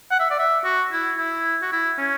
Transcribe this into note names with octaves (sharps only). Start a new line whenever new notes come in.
F#5
E5
D5
E5
F#4
E4
E4
F#4
E4
C#4